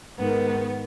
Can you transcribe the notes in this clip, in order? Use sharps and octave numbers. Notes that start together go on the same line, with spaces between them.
G#2 D#3 B3